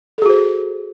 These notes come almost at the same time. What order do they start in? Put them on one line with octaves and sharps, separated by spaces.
A4 G#4 F#4 C5